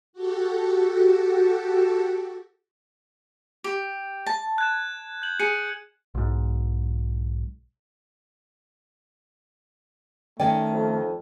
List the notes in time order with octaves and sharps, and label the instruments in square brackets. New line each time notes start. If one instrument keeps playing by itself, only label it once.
[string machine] F#4 G4 A4
[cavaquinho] G4
A5
[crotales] F#6 G#6 E7
G6 F#7
[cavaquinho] G#4 [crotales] C#7
[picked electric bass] B1 G#2
[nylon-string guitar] D#3 C#4 D5 [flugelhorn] A3 [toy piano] G5
[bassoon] F2